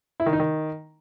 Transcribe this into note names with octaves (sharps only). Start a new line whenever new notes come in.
E4
D#3
D#4
D#3